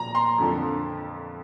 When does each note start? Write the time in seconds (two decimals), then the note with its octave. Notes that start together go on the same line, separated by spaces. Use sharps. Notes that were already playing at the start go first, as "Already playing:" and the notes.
Already playing: A#2 F3 A#5
0.15 C6
0.38 F2 D3 F3